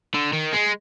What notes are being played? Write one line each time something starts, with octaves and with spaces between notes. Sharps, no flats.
D3
D#3
G#3